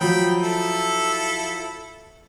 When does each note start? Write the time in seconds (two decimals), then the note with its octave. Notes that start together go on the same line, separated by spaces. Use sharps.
0.01 F3 F#3 G5 B5
0.43 E4 A4